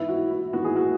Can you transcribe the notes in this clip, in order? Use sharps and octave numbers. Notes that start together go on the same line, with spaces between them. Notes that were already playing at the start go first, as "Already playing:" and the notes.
Already playing: G#2 E3 B3 E4
F#4
E4
G#2 E3 B3 F#4
G#4
F#4